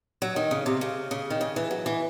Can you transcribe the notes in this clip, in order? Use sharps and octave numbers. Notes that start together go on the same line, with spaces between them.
F#3
D#3
C#3
C3
C#3
C#3
D#3
C#3
E3
F#3
E3